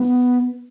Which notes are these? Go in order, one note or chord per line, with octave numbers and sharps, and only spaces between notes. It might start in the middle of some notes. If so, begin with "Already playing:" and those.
Already playing: B3